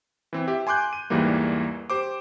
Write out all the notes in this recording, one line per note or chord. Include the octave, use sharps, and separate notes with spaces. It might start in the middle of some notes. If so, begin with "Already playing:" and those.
E3 C4
G4 E5
G#5 C6 D6 F#6 G6
D#7
E2 G#2 E3 G3 A#3
G4 C5 D6